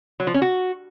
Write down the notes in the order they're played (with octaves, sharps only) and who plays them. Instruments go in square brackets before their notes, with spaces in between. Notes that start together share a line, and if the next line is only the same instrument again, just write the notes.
[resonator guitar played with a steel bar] F#3
F3
C#4
F#4